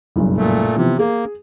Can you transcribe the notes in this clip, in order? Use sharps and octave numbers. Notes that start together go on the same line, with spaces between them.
F#1 B1 G2
A#2 A3
C3 E3 F3 B3
A#3 G#4